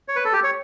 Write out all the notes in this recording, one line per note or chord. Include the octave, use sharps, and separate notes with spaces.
C#5
B4
A4
G4
C#5